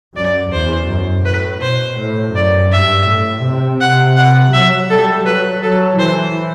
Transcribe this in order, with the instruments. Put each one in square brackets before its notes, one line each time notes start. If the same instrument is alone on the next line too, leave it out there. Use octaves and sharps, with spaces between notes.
[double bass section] F#2 [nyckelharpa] D5
[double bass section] E2 [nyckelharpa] C5
[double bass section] F#2
[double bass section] A2 [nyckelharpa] B4
[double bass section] B2 [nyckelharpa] C5
[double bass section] A2
[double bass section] F#2 [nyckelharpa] D5
[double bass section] G2 [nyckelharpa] E5
[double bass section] A2
C3
[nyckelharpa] F#5
F#5
[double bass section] F#3 [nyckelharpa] E5
[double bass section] G3 [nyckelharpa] A4
[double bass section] F#3 [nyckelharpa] B4
[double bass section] F#3 [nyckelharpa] A4
[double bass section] E3 [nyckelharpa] C5